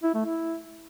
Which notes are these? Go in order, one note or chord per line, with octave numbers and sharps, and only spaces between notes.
E4
A3
E4